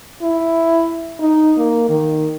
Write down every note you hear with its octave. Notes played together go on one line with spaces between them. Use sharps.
E4
D#4
A#3
D#3